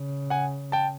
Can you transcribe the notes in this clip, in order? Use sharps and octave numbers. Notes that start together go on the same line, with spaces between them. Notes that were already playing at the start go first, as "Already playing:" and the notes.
Already playing: C#3
F#5 G#5
G5 A5